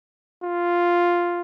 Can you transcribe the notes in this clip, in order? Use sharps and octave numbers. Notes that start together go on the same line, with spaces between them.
F4